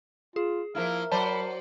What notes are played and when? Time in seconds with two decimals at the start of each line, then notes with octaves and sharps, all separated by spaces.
0.36 F4 G#4
0.75 F3 A#3 E4 A#4 F5
1.11 F#3 C5 D5 A5 B5